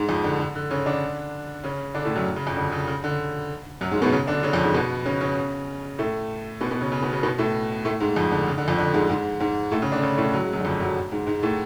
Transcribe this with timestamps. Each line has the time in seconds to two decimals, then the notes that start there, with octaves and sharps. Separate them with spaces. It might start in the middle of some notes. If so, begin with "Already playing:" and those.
Already playing: G#2 G#3
0.09 F2 F3
0.24 D3
0.39 D3
0.55 D3
0.71 C#3 C#4
0.86 D3 D4
1.64 C#3 C#4
1.95 D3 D4
2.05 A2 A3
2.15 F#2 F#3
2.36 C#3
2.46 F2 F3
2.57 D3
2.72 C#3
2.87 C#3
3.04 D3
3.81 F#2 F#3
3.91 G#2 G#3
4.02 B2 B3
4.12 C#3 C#4
4.27 D3 D4
4.43 C#3 C#4
4.53 F2 F3
4.64 G#2 G#3
4.74 B2 B3
5.05 C#3 C#4
5.21 C#3 C#4
5.99 A2 A3
6.61 B2 B3
6.71 B2 B3
6.81 C#3 C#4
6.92 C#3 C#4
7.02 B2 B3
7.13 C#3 C#4
7.23 B2 B3
7.38 A2 A3
7.85 A2 A3
8.00 G#2 G#3
8.16 F2 F3
8.32 D3
8.47 C#3
8.58 D3
8.68 F2 F3
8.79 D3
8.94 G#2 G#3
9.09 G#2 G#3
9.40 G#2 G#3
9.71 A2 A3
9.82 C#3 C#4
9.92 D3 D4
10.02 C#3 C#4
10.18 A2 A3
10.34 F#3
10.44 G#3
10.53 F#2 F#3
10.61 D3
10.65 F2 F3
10.80 F#2 F#3
11.12 G#2 G#3
11.26 G#2 G#3
11.42 A2 A3